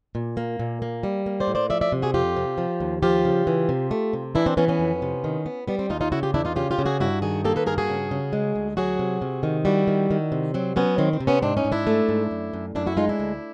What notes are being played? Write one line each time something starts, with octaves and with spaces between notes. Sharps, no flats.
A#2
A#3
A#2
A#3
G3
A#3
C5 D5
A2
C5 D5
F3 D5 E5
D5 E5
C3
F#4 G#4
F2 F4 G4
C3
F3
D#2
F3 F4 G4
C#3
E3
C3
A3
C3
E3 D4 E4
C4 D4
E3 B3 C#4
B3 C#4
F2
C3
D#3
B3
G3 B3
C4
D#2 D#4 F4
D#4 F4
C#3 E4 F#4
F4 G4
E2 D4 E4
D#4 F4
C#3 F4 G4
F4 G4
C#3
F#4 G#4
G2 E4 F#4
D#3 F#4 G#4
A#3 G4 A4
A4 B4
G2 G#4 A#4
F#4 G#4
C#3
C#3
G#3
D2
F#3 F#4 G#4
C3
C3
D#3
G3 E4 F#4
D#3
D#3
C3
F#3 C4
F#3 B3 C#4
D#3 C4
C4
C3
B3 C#4
G#2 C4 D4
C#4 D#4
G#2
D4 E4
A3
G#2
F#2
F#2
F#2 D4 E4
E4 F#4
G#3 D#4 F4
D4 E4
D2